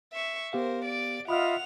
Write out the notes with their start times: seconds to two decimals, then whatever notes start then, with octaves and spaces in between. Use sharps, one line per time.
0.13 E5 C#6
0.53 B3 G4 A#4 C5 F5
0.85 D5 D7
1.28 F4 D#5 E5 F#5 B5 D#6 F6 F7